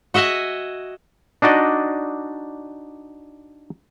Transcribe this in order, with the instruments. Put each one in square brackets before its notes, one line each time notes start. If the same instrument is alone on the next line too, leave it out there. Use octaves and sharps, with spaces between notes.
[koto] F#4 D#5 E5 F#5 G#5
[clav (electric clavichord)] D4 D#4 F#4 D5 D#5